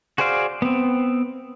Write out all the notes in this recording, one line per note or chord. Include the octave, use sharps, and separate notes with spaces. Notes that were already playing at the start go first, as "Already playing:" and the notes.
F#4 G#4 C5 D5 F5
B3 C4